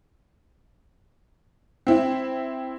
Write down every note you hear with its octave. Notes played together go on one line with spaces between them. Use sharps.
C4 E4